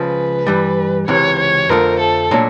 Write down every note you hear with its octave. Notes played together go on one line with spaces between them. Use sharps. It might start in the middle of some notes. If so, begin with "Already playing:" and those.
Already playing: C#2 C#3 F3 B4
G2 E3 G3
C#2 C3 E3 C#5
C#5
F2 D3 F3 A3 A#4
A4
A#2 F#3 A3 D4